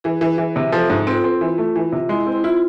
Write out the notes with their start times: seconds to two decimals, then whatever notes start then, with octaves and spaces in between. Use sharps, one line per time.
0.04 E3 G#4
0.21 E3
0.38 E3
0.56 C3
0.72 F3 A4
0.90 G#2
1.07 C4 F4
1.24 C4
1.41 E3
1.58 A3
1.76 E3
1.92 C3
2.09 G#3 E4
2.20 E4
2.27 C4
2.32 E4
2.44 E4 F4